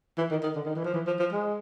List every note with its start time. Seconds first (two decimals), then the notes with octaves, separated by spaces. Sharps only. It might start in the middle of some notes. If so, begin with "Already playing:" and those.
0.18 E3
0.31 D#3
0.43 D#3
0.55 D3
0.66 D#3
0.76 E3
0.85 F3
0.94 E3
1.07 F3
1.19 F3
1.32 G#3